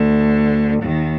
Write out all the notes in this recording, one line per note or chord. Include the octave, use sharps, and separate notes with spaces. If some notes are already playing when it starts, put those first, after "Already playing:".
Already playing: D2 D3
D#2 D#3